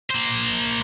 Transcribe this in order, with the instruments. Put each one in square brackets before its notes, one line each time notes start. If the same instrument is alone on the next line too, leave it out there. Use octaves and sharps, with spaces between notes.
[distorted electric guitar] A#3 C5